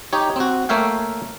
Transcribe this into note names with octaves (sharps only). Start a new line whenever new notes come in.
D#4 G4 C#5
C4 F#4
A3 A#3 C#5 E5 F5 G5